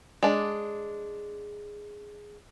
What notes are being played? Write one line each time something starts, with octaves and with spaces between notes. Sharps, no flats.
G#3 D4